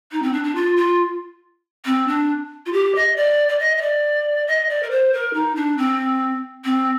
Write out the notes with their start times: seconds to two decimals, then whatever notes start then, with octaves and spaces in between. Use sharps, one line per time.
0.12 D#4
0.23 C4
0.33 D4
0.44 D4
0.55 F4
0.77 F4
1.86 C4
2.08 D4
2.66 F4
2.73 G4
2.95 D#5
3.16 D5
3.49 D5
3.59 D#5
3.77 D#5
3.82 D5
4.47 D#5
4.69 D5
4.83 A#4
4.90 C5
5.13 A#4
5.34 D#4
5.56 D4
5.78 C4
6.65 C4